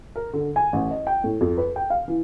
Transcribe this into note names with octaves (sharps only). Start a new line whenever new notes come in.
A#4
D3
G#5
A1
D#5
G5
A2
F2
B4
G5
F5
E3